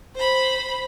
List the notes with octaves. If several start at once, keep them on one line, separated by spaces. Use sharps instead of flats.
C5 B5